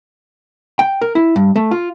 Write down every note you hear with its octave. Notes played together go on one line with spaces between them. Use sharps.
G5
A#4
E4
G2
A3
F4